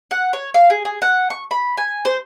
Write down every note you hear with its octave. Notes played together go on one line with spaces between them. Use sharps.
F#5
C#5
F5
G#4
G#4
F#5
C#6
B5
G#5
C5